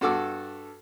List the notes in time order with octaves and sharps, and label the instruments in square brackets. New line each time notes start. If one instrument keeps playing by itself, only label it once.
[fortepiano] G2 F#4 A4 D6 E6